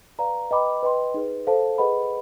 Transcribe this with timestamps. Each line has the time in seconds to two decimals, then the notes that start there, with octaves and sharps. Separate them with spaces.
0.19 B4 D5 F5 A#5
0.51 B4 D#5 G5 B5 D6
0.83 B4 D#5 G5 C6
1.14 D#4 G#4 B4
1.47 A4 C5 F5 A5
1.78 G#4 B4 D#5 F#5 B5